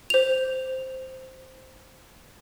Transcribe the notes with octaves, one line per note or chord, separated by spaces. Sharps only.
C5 F7